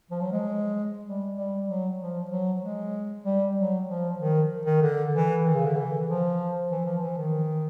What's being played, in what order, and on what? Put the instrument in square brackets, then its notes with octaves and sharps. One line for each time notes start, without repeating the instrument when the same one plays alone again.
[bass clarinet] F3
F#3
G#3
G3
G3
F#3
F3
F#3
G#3
G3
F#3
F3
D#3
D#3
D3
E3
D#3
C#3
D3
E3
F3
E3
F3
E3
D#3